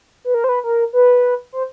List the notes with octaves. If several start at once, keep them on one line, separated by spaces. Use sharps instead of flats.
B4
A#4
C5
B4
A#4
B4
C5